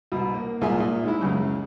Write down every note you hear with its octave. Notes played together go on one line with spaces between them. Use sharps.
C2 B2
A#3
C2 A#2 G#4 E5 G#5
A#2
G#2 G#3 E4
C#2 F#2 C#3